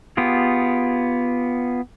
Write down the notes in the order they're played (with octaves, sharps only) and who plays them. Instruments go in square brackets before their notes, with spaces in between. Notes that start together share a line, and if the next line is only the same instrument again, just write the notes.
[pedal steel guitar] B3 F4 G4 G#4